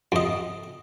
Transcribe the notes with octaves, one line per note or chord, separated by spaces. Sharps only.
F2 D#5